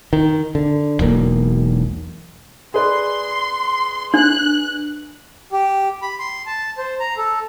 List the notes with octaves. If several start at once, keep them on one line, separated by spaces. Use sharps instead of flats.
D#3
D3
E1 B1 A#3
G#4 B4 D5 C6
D4 F#6
G4
B5
C6
A5
C5
A#5
A4